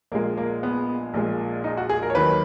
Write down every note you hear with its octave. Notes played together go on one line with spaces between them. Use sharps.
A#1 A#2 G#3 A#3
A#3
B3
A#1 A#2 G#3
D#4
F#4
G#4
A#4
C#5
D#2 D#3 F#3 B4